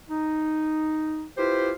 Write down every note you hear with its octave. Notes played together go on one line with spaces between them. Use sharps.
D#4
E4 F4 G4 B4 C5